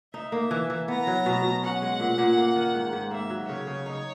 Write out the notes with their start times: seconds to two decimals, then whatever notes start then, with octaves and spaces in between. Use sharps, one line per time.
0.14 D#4 E5
0.32 A#3
0.51 E3
0.70 E3
0.88 B3 A#5
1.07 F#3
1.26 B2
1.44 B2
1.63 C#4 F#5
1.82 G#3
2.00 A#2
2.18 A#2
2.37 A#3
2.56 D#3
2.74 G#2
2.93 G#2
3.11 A#3 E5
3.30 F#3
3.48 C#3 C#5
3.67 C#3
3.86 D#4